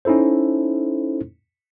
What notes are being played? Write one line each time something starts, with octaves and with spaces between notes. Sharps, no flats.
C#4 D#4 E4 A4 C5